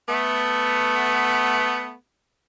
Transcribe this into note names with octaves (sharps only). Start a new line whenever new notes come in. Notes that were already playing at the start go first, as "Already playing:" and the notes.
A3 B3